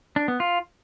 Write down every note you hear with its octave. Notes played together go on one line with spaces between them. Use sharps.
D4
B3
F4